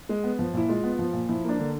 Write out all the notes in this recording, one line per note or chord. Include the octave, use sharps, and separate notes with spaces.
G#3
B3
F3
A#2 E4
G#3 F4
B3
F3
A#2
F3 E4
A#3 D4
D3